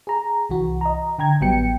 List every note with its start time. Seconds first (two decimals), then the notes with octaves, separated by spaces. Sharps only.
0.07 G#4 A#5
0.50 C2 E3 F#4
0.81 D#5 A#5
1.19 D3 G5 A#5 G#6
1.41 A1 F#3 G3 B3 G5 C#7